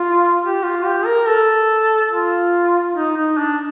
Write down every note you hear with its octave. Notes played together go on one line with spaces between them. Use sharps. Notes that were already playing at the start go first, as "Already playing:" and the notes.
Already playing: F4
G4
F4
G4
A#4
A4
F4
D#4
D#4
D4